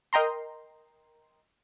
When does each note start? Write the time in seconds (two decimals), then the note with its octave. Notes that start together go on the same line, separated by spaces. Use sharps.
0.13 A#4 D#5 G5 A#5 C6